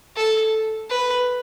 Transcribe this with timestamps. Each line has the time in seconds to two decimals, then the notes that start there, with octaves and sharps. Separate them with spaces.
0.16 A4
0.90 B4